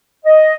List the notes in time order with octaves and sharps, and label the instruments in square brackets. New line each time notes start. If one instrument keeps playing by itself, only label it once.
[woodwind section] D#5